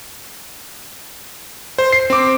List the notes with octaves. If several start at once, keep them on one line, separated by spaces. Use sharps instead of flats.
C5
C7
C4 D6